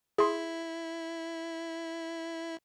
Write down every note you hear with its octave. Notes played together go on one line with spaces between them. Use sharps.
E4 G#4 C6